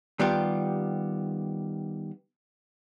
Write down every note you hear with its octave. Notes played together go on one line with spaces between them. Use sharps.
D#3 G3 B3 F4 G4